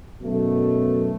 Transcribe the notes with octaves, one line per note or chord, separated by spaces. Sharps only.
F#2 B2 F#3 A3